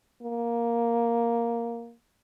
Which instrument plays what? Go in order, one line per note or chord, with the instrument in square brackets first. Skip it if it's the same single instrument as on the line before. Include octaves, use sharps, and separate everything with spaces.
[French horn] A#3